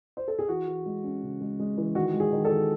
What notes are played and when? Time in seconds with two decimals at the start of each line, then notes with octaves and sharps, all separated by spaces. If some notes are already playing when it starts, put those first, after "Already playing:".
0.17 C5
0.28 A4
0.39 G#4
0.48 E3 F#4
0.67 E3
0.86 G#3
1.04 C#4
1.23 C#3
1.41 G#3
1.59 G#3
1.78 E3
1.95 D#3 F#4
2.14 G#3
2.20 G#4
2.32 D#3
2.45 A4
2.51 D#3